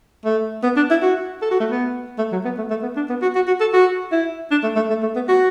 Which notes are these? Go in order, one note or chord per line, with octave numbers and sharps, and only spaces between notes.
A3
B3
D4
E4
F#4
A4
F#4
A3
B3
A3
F#3
B3
A3
A3
B3
D4
B3
F#4
F#4
F#4
A4
F#4
E4
D4
A3
A3
A3
A3
B3
F#4